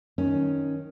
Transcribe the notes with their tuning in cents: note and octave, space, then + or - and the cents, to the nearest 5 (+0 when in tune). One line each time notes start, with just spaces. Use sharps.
D#3 +0 C#4 +0